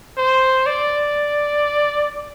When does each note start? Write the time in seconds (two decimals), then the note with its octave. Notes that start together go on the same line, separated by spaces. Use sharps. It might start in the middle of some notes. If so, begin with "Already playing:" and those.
0.17 C5
0.66 D5